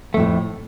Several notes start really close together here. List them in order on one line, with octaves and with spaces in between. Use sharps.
A3 F2 A2